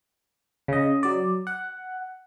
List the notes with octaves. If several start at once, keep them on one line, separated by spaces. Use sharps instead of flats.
C#3 D#5
F#3 D5
F#5